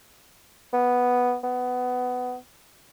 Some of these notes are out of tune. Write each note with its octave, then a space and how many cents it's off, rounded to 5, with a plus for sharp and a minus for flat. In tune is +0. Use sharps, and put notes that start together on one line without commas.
B3 +0
B3 +15